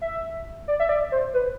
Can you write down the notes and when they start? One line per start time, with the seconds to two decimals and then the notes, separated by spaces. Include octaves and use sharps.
0.01 E5
0.68 D5
0.80 E5
0.89 D5
1.12 C5
1.34 B4